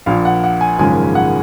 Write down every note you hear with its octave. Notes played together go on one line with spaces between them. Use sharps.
A#1 A#2 F3 F5
F#5
F#5
G#5
G#1 F#2 C#3 F3 G#3 G#5
F#5